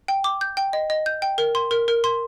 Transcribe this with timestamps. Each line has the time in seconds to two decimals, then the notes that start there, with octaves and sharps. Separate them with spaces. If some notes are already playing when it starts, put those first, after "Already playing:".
0.08 G5
0.24 D6
0.41 G6
0.57 G5
0.73 D#5
0.90 D#5
1.06 G6
1.22 G5
1.38 A#4
1.55 C6
1.71 A#4
1.88 A#4
2.04 C6